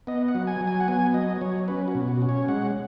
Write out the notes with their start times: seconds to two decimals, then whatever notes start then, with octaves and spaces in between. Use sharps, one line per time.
0.07 B3 D#5
0.28 F#5
0.35 F#3
0.47 G#5
0.61 F#3
0.68 G#5
0.80 F#5
0.88 B3 G#5
1.14 F#3 D#5
1.41 F#3 C#5
1.68 C#4 B4
1.88 F#4
1.95 B2
2.08 F#4
2.22 C#4
2.29 C#5
2.48 G#3 F#5